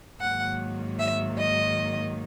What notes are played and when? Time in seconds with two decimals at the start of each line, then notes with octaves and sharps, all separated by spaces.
0.20 G#2 D#3 F#3 A#3 F#5
0.99 E5
1.37 D#5